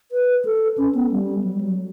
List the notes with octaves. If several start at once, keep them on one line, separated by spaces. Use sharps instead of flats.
B4
A4
C#4
B3
G3
F#3
G3
F#3